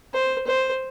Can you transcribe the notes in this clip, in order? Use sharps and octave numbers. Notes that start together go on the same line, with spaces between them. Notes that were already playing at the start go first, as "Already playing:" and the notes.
C5
C5